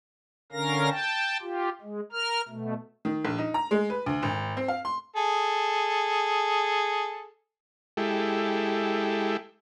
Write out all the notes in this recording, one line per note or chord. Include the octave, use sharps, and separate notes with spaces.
D3 C#4 A#4 F5 A#6
G5 A5
F4 G4
G#3
A#4 F6
B2 A3
D#3
A#1
D#4
A#5
G#3
B4
D2
G#1
C4
F5
C6
G#4 A4
G#3 E4 G4 A4